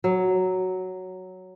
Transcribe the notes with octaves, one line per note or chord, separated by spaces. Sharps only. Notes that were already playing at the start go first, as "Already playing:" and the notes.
F#3